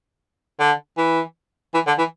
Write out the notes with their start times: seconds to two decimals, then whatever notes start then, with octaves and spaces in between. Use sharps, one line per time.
0.59 D3
0.97 E3
1.74 E3
1.87 D3
1.98 E3